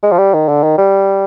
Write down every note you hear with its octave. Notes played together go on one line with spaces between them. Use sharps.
G#3
F3
G3
D#3
D3
D#3
G3